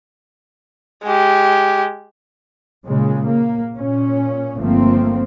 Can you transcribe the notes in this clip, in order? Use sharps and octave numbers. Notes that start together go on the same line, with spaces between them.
G#3 G4
A#2 C#3 G#3
A#3
A#2 C#4
G1 F3 A3 A#3 C4